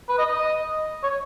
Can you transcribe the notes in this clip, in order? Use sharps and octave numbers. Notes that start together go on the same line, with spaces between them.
B4
D#5
D#5
C#5